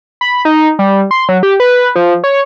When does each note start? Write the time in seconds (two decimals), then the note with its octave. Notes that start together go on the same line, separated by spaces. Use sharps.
0.21 B5
0.45 D#4
0.79 G3
1.11 C6
1.29 F#3
1.43 G4
1.60 B4
1.96 F3
2.24 C#5